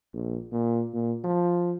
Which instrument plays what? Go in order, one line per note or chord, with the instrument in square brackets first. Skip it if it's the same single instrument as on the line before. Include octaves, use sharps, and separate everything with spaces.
[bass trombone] A#1
A#2
A#2
F3